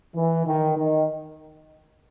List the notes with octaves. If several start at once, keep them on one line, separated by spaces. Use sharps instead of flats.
E3
D#3
D#3